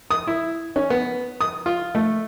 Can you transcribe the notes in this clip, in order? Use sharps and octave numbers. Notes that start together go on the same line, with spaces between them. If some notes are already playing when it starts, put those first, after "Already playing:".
D#6
E4
C#4
B3
D#6
F4
A3